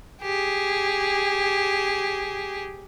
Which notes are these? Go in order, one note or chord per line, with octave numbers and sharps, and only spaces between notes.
G4 G#4